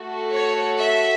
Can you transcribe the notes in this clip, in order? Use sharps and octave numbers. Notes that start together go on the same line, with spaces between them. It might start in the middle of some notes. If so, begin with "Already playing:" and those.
Already playing: A3 F#4 A4
C#5
E5